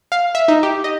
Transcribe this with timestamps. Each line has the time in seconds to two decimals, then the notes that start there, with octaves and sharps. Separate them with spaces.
0.12 F5
0.35 E5
0.48 D#4
0.63 G4
0.84 D#5